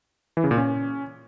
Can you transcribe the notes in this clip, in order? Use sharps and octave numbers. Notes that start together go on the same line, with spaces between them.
E3
C#3
A#2
C#4